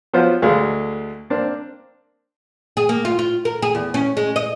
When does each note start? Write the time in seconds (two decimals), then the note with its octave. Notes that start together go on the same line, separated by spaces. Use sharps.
0.13 F3 F#3 B3 F4 C5
0.42 D2 G#3 A3 F5
1.30 A#3 C4 D4
2.77 G#4
2.89 A#3
3.05 F4
3.19 F4
3.45 A#4
3.62 G#4
3.75 E2
3.94 C#4
4.17 G#3
4.36 D#5